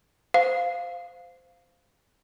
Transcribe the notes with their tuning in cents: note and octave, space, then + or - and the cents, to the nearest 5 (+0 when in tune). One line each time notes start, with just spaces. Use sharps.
C5 -15 F5 +0